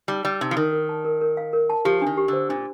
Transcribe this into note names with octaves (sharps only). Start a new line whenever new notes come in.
G3 D#4
G3 D5
C3 D#4
F3
D#3 A#4
A#4
A5
A#4
A#4
F5
A#4
A5
F3 G4
D#3 D4
G4
D3 C5
A#2 D4